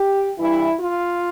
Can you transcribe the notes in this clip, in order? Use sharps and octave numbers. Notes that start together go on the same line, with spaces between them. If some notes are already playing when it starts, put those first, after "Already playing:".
Already playing: G4
G2 E3 G3 E4
F4